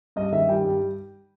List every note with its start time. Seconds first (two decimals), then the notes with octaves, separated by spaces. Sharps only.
0.16 G2 D#5
0.32 D#3 E5
0.49 G3 G5
0.64 G2